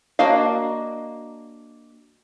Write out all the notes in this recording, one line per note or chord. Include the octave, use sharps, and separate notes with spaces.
A#3 D4 F#4 D#5 F5